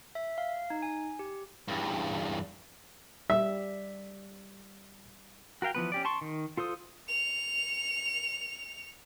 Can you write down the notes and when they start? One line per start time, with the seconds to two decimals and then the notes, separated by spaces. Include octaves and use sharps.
0.15 E5
0.38 F5
0.70 D#4
0.82 G#5
1.19 G4
1.68 E2 G2
3.30 G3 E5
5.62 F#4 A#4 F5 G5
5.75 E3 F3 B3 B4
5.92 C#4 G4 D5
6.05 A5 C6 C#6
6.21 D#3
6.57 F4 A4 C5 D#6
7.08 C#7 F7